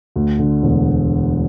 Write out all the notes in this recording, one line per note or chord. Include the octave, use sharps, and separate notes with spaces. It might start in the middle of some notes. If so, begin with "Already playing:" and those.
D2
D3
E1